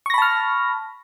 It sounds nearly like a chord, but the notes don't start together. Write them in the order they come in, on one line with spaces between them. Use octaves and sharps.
C#6 A#6 B5 A5 F6